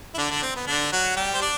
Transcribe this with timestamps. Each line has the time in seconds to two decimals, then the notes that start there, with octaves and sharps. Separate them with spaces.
0.14 E4
0.18 D3 D4
0.30 D3 D4
0.43 C4
0.56 B3
0.67 D3 D4
0.92 F#3 F#4
1.16 G3 G4
1.34 C5
1.41 D4 D5